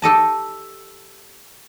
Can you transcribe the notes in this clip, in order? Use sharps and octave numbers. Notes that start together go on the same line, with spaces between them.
G4 A4 D#5 A5